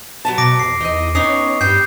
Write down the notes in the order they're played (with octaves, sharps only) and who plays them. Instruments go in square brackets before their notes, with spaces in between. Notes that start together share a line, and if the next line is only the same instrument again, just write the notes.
[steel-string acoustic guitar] F#3 B3 A5
[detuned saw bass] B2 [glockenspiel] D6 A#6 D7
[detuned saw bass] F2 [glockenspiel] C7
[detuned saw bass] E2 [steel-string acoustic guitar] D#4 D#5
[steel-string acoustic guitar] B3 D#4 C#5 [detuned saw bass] C#4 [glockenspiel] D#6 C7
[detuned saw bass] G2 [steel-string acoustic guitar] G3 G5 [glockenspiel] G6 C7